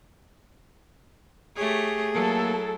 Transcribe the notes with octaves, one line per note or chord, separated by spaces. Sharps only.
A3 G4 G#4 C#5
F#3 A#3 E4 A4